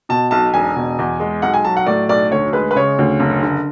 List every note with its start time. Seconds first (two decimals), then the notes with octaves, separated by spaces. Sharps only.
0.09 B2 A5
0.31 B1 A5
0.54 E1 G#5
0.76 B2
0.99 E2
1.20 G#3
1.42 B1 F#5
1.54 G#5
1.65 F#3 A5
1.77 F#5
1.87 A2 D5
2.09 B1 D5
2.32 D2 C#5
2.53 G#3 B4
2.71 B4
2.76 C#3 C#5
2.99 D2
3.20 F#1
3.43 D3